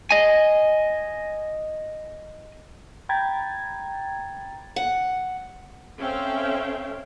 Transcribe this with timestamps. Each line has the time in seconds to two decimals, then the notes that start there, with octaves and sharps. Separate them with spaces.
0.11 D#5 G#5
3.09 G5 A#5 B5 G#6 A6
4.76 F#5
5.99 C4 C#4 A4 E5 F5 G5